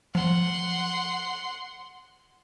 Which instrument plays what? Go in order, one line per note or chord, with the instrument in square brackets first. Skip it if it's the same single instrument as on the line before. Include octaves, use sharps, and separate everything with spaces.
[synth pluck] F3 [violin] F#5 C6